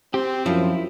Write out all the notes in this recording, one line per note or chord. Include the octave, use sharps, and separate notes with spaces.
C4 G4
F#2 F3 E4